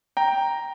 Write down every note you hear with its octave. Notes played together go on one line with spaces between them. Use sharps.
G5 A#5